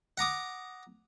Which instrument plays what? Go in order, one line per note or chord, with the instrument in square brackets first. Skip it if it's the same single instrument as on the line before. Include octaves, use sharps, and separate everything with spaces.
[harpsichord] F#5 A#5 D6 D#6